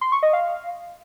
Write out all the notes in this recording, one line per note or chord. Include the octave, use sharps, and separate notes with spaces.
C6
C#6
D#5
F5